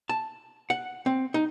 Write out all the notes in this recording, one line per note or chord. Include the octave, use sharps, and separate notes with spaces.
A5
F#5
C4
D#4